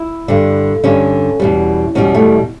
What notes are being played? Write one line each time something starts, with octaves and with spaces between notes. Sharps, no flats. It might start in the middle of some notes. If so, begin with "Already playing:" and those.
Already playing: E4
G2 D3 G3
G2 D3 G3 C#4
E2 B2 G3
E2 B2 G3 C#4
A3